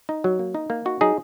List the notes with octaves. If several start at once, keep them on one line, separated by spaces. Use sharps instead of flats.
D#4
F#3
A#3
D#4
A#3
D#4 F#4
F#3 D#4 G#4